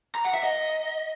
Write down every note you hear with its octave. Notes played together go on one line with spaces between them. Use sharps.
A#5
F#5
E5
D#5